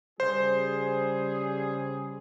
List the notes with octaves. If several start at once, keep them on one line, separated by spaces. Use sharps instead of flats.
C#3 G3 G#4 C5